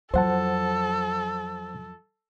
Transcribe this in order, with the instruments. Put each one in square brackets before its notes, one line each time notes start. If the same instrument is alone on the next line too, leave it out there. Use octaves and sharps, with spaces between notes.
[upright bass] F2 F#3 [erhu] A4 [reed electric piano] C5 F#5 A5